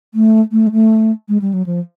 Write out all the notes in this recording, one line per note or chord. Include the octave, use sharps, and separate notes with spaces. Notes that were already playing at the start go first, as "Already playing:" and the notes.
A3
A3
G#3
A3
G#3
G3
F#3
F3